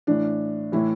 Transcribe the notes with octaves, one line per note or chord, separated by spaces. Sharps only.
A2 E3 D4
A2 E3 E4